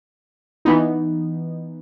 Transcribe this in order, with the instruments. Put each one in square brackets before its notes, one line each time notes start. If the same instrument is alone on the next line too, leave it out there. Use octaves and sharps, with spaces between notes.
[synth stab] E3 B3 D#4